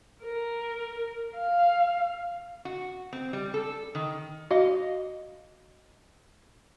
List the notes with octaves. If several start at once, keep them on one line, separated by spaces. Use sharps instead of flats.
A#4
F5
F#4
C4
G3
A4
D#3
F#4 D#5 F5